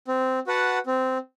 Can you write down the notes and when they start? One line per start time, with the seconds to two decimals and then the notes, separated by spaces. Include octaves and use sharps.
0.08 C4
0.47 F#4 B4 F#5 A5
0.87 C4